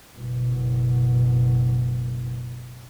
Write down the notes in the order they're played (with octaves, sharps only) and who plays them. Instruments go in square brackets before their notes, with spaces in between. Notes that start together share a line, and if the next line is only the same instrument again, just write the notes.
[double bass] F#1 B2